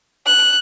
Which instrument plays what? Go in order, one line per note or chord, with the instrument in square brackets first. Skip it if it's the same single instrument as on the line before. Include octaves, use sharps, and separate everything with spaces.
[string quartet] F#6